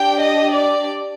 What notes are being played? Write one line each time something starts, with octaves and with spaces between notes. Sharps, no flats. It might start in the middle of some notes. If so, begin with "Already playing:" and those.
Already playing: D4 G4 G5
D#5
D5